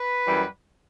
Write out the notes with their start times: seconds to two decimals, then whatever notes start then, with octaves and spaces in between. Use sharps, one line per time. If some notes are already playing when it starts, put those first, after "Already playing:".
Already playing: B4
0.26 F#2 E3 G3